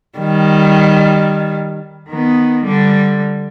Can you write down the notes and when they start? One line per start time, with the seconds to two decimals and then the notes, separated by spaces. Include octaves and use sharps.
0.19 D#3 G3
2.09 D#3 B3
2.64 D3 G3